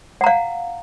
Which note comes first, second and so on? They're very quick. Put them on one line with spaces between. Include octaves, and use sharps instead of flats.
F#5 A#5 F5